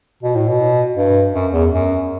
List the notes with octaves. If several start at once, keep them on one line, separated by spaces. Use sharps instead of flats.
B2
A2
B2
G2
F#2
E2
F#2